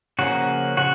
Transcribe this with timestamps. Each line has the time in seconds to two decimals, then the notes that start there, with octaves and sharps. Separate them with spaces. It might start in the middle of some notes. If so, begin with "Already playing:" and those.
0.19 C#3 F3 A#3 C#4 F#4
0.77 C#3 F3 F#4